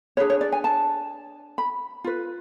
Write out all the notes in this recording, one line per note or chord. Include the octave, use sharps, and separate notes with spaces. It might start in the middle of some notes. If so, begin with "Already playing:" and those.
D4 G#4 B4 C#5
C#5
D5
G#5
A5
B5
F4 B4